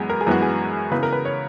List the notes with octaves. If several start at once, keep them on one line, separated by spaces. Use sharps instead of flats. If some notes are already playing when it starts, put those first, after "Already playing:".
Already playing: F#2 E3 G#3 B3 G#4
A#4
G#4
F#2 E3 G#3 B3 F#4
G#4
C#3 E3 B3 B4
A#4
B4
C#5